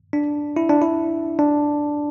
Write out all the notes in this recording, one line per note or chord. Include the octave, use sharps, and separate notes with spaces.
D4
E4
D4
E4
D4